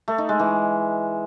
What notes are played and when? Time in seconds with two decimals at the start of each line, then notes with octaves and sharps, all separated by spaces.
0.08 A3
0.18 D#4
0.29 G#3
0.39 E3